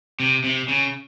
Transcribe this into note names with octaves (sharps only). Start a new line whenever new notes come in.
C3
C3
C#3